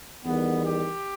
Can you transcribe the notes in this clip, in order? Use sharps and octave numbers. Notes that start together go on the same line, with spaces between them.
E2 D#3 G3 B3
G4